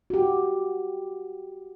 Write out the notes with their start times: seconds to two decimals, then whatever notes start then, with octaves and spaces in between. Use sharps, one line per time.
0.10 F#4 G4